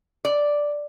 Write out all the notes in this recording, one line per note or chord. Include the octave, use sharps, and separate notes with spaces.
D5